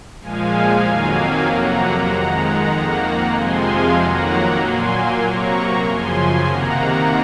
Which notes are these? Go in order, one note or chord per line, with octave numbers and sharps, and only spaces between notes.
A#2 F3 G#3 F5 G#5
F2 D#3 F#3 A#3
F2 C3 F#3 A#3 F#5 A#5
F2 D#3 G#3 F#5 A#5
F2 D#3 A#3
F2 C3 F3 G#3 G#5 C6
F5 G#5
F2 D#3 F#3 A#3 F#5 A#5
A#2 F#3 A#3 G#5 C6
C3 F#3 A#3 A#5 C#6
F#2 C#3 F3 G#5 C6
C3 D#3 A#3 F#5 A#5